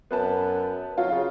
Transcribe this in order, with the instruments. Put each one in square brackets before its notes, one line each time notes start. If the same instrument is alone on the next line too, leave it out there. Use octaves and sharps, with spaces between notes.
[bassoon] F#2 [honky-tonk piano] B3 B4 A5
[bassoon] F#3 [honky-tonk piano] F4
[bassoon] C#3